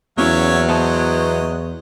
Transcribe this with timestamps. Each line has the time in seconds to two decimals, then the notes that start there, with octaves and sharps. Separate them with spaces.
0.18 E2 F#3 A#3 C#4 E4 C#5 E5 F5
0.69 B3 C5 D#5 A5